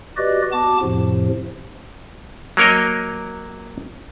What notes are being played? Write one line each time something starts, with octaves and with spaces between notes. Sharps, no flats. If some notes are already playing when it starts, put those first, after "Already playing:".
F#4 G4 B4 D5 D#5
B3 F#4 A5 D6
F2 A2 C3 F3
F#3 A#3 A#4 C#5 D#5